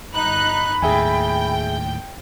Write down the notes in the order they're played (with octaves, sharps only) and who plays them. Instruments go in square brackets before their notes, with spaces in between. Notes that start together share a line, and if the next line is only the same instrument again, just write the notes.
[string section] G1 D#4 F#6 [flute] B5
[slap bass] D#2 A2 [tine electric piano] G#4 E5 G#5 [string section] G5